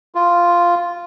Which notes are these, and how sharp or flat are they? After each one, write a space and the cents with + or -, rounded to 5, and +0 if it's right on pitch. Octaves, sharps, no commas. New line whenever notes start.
F4 -5